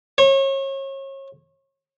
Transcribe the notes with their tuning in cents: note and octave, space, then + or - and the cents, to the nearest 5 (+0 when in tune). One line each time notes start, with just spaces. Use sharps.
C#5 -35